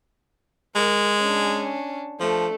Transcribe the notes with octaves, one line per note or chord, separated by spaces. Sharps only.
G#3 A#4
C#4 D4
F3 A3 D4